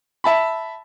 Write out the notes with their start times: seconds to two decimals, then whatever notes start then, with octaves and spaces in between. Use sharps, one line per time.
0.24 E5 A5 B5